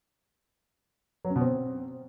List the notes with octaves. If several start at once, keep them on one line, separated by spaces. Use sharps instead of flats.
F#3
C#4
B2
C4